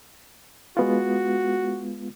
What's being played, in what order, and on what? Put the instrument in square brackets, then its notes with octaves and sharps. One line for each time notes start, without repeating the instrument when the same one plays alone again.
[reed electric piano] G#3 B3 F4 [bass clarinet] F#4